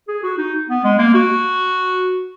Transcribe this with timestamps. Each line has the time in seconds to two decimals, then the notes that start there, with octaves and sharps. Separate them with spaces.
0.08 G#4
0.24 F#4
0.38 D#4
0.69 B3
0.85 G#3
0.99 A#3
1.15 F#4